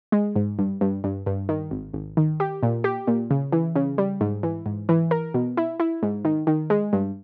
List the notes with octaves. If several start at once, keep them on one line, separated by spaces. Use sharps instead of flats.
G#3
G#2
G2
G2
G2
G2
D#3
G#1
G#1
D#3
G4
A#2
G4
A#2
C#3
E3
C#3
G3
G#2
E3
G#2
E3
A#4
B2
E4
E4
G#2
D#3
D#3
G#3
G2